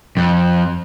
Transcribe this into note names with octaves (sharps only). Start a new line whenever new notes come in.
F2